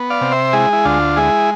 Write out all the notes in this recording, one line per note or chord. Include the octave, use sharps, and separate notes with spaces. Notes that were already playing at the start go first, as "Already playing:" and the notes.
Already playing: B3
D5 F5
C3
C5 E5
G#3 E4 G#4
E4
D2 D4 F4
G#3 E4 G#4